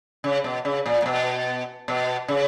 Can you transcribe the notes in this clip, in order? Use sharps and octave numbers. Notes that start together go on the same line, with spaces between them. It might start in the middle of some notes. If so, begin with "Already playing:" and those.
C#3
B2
C#3
A#2
A#2
B2
B2
C#3